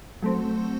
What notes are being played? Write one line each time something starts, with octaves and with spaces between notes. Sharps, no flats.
F#3 A3 C4